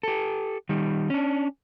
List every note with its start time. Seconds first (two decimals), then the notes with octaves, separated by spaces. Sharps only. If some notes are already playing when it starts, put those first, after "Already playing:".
0.03 G4 A4
0.69 D#3 G3
1.10 C#4 D4